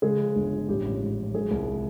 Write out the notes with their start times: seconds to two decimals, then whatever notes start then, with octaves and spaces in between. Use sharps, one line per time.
0.02 C#3 G#3 G#4
0.20 F3
0.36 G1
0.52 F3
0.69 A1 G3 G4
0.85 A1
1.01 G#2
1.17 F3
1.34 F#3 G#3 G#4
1.51 C2